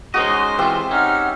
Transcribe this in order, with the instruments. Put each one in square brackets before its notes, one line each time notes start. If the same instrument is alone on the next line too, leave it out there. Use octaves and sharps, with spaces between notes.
[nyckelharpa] G#3 C5 [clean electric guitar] C#4 D#4 D#5 [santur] F#4
[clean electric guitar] E3 F4 [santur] C4 G4 E5 [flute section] B4
[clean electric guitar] C#4 [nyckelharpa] D#4 [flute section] F#5 E6 F6